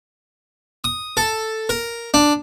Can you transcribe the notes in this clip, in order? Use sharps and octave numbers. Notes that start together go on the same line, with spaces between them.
D#6
A4
A#4
D4